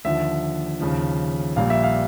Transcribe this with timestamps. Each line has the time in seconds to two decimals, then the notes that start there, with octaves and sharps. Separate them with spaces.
0.05 D#2 D3 F3 E5
0.80 D#2 C#3 F3
1.56 A#1 A#2 G3 F5
1.70 E5
1.84 F5